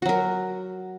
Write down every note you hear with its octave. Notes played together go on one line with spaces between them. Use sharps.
F#3 F#4 A#4